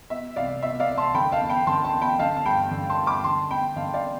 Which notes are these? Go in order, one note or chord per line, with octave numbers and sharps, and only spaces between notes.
B2 E5
C2 D5 F5
B2 E5
D5 F5
C2
A5 C6
D3 G5 B5
F5 A5
E2
G5 B5
D3 A5 C6
A5 C6
E2
G5 B5
D3 F5 A5
A5
G2 G5 B5
D3
A5 C6
G2
B5 D6
D3 A5 C6
E2 G5 B5
D3 F5 A5
D5 F5